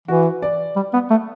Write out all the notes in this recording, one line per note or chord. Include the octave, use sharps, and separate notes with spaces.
E3 F#4
D5
G3
B3
A3